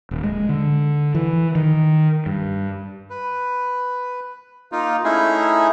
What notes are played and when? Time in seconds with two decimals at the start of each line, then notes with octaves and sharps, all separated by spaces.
0.11 D#1
0.24 G#3
0.49 D3
1.15 E3
1.55 D#3
2.26 G2
3.10 B4
4.72 A#3 D#4 F4
5.04 A3 C#4 D#4 E4 G#4